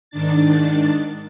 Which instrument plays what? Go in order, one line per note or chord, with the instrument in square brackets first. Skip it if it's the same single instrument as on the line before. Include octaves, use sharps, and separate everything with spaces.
[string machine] G#2 D#3 D4 A6